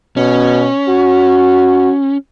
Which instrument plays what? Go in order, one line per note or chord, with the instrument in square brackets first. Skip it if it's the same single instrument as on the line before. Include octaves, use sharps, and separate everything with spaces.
[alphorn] B2 [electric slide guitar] C#4
[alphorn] F#4